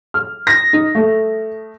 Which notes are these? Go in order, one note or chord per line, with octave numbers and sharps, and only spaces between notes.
F6
A#6
D#4
A3